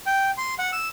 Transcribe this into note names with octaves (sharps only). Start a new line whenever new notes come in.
G5
C6
F#5
E6